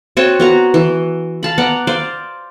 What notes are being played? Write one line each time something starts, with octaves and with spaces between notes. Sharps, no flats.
C4 F#4 C#5 A5
B3 F#4 A#5
E3
F5 A5 B5
B3 D5 F#5 A#5
C5 D5 F5